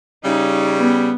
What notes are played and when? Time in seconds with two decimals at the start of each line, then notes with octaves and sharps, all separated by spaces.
0.25 C#3 G3 D#4
0.79 B3